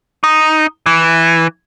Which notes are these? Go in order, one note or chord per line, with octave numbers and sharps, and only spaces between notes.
D#4
E3